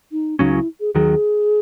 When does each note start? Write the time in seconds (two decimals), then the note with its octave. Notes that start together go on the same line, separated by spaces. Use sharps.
0.12 D#4
0.39 C#2 C#3 F#3 C#4 D#4
0.53 E4
0.80 G#4
0.94 D#2 D#3 F#3 G#4